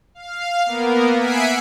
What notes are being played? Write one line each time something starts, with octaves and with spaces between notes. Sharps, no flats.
F5
A#3 B3 A#4
E5 F#5 G#5 B6 C7 D7